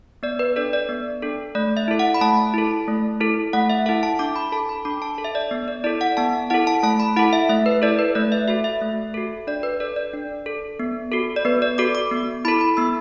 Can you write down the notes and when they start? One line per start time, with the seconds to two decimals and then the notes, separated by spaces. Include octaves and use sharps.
0.23 B3 D5
0.39 B4
0.56 D4 A4 D5
0.73 D5
0.89 B3
1.22 D4 A4
1.55 A3 D5
1.77 E5
1.88 E4 A4
1.99 F#5
2.14 B5
2.21 A3 A5
2.54 E4 A4
2.88 A3
3.20 E4 A4
3.53 A3 F#5
3.70 E5
3.86 E4 A4 F#5
4.03 A5
4.19 D4 D6
4.36 B5
4.52 A4 A5
4.69 B5
4.85 D4 D6
5.02 A5
5.18 A4
5.24 E5
5.35 D5
5.51 B3
5.68 D5
5.84 E4 A4 D5
6.01 F#5
6.17 B3 A5
6.50 E4 A4 F#5
6.67 A5
6.83 A3 A5
7.00 B5
7.16 E4 A4 F#5
7.33 E5
7.49 A3 E5
7.66 B4
7.82 E4 A4 D5
7.99 B4
8.15 A3 D5
8.32 E5
8.48 F#4 A4 E5
8.64 E5
8.81 A3
9.14 F#4 A4
9.47 D4 D5
9.63 B4
9.80 A4 D5
9.96 D5
10.13 D4
10.46 A4
10.79 B3
11.12 F#4 A4
11.36 D5
11.45 B3 B4
11.62 D5
11.78 F#4 A4 D6
11.95 D6
12.12 B3
12.45 E4 A4 B5
12.61 B5
12.77 B3 E6